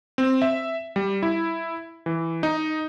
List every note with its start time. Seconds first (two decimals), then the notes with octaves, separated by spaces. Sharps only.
0.18 C4
0.42 E5
0.96 G3
1.23 E4
2.06 E3
2.43 D#4